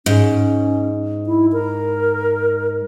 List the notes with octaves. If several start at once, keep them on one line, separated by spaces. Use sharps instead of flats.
G#2 C#4
E4
A#4